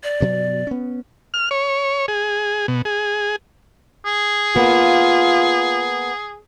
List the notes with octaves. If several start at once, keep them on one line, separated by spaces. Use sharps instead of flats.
D5
G2 B2 F#3
B3 C#4
F6
C#5
G#4
B2
G#4
G#4
A#3 B3 F4